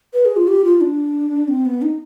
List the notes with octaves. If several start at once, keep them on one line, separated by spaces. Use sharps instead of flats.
B4
G#4
F4
G4
F4
D4
C4
B3
D#4